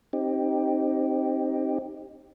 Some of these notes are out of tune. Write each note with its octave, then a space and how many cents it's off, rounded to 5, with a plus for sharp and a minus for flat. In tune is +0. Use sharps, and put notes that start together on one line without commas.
C4 +25 D#4 +0 G4 +0